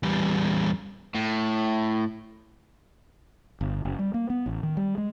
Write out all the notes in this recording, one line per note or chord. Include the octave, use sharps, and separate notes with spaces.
E2 G3
A2
G1
F#1
G3
A#3
B3
A1
D#3
G3
G#3